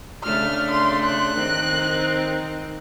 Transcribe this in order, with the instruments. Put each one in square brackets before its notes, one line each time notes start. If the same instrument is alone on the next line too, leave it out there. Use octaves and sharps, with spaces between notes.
[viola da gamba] C#3 A3 D4 [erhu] F6
[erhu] C6
F#6
[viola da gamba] D#3 C4 D#4